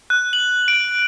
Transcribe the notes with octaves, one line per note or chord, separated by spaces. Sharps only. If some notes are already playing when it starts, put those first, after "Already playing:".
F#6
F#7
D7